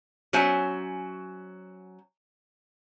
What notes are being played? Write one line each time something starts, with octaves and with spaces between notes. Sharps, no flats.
F#3 C#4 C5 E5 G#5